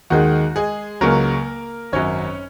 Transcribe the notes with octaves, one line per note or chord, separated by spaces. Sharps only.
D#2 D#3 G#3 F#4
G#3 G#4
C#2 C#3 F#3 A#3 A#4
G#1 F#2 F#3 C#4 C#5